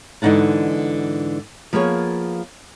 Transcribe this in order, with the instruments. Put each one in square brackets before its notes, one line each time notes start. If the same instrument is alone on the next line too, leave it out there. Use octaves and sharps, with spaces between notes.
[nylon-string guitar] G#2 D3 E3 D#4 F#5 A5
F3 A#3 B3 G#4 C#5